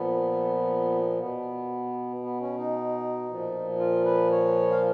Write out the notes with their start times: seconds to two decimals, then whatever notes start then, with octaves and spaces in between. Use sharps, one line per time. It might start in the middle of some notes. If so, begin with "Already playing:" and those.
Already playing: A#2 F3 B3
1.19 B2 B3
2.23 B3
2.40 C#4
2.58 D#4
3.28 A#2 F3
3.79 F4
4.05 B4
4.31 C#5
4.71 F5